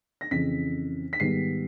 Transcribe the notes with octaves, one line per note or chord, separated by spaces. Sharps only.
A#6
F2 C#3 E3 B6
B6
G#2 D#3 G3 B3 C7